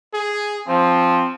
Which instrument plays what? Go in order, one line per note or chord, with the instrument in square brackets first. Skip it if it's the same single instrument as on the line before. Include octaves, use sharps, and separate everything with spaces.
[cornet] G#4
[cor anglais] F3 [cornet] C4